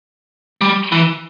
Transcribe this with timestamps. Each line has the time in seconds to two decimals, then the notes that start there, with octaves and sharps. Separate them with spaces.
0.61 G3
0.92 E3